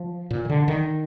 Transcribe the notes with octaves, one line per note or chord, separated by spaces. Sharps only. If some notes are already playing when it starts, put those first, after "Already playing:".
Already playing: F3
A#2
D#3
D3
D#3